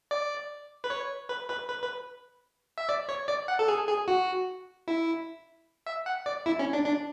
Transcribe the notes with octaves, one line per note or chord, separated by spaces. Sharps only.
D5
B4
C#5
B4
B4
B4
B4
E5
D5
C#5
D5
F#5
A4
G#4
G#4
F#4
E4
E5
F#5
D5
E4
C#4
D4
D4